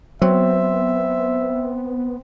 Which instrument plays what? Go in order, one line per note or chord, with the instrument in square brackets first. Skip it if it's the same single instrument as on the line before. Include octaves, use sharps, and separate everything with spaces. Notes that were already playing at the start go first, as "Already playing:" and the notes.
[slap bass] F#3 [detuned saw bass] B3 [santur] C4 [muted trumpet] E5